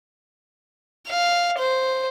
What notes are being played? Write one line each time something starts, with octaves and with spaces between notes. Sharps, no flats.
F5
C5